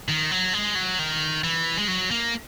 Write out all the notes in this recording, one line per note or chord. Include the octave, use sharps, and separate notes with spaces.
D#3
F#3
G#3
F#3
D#3
E3
G#3
F#3
A#3